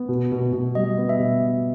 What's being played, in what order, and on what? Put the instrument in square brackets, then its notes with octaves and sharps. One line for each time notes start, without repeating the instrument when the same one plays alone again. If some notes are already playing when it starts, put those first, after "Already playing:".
Already playing: [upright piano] B3
B2
B2
B2
[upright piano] G3 [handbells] D#5
[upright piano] B3
[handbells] E5
[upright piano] B2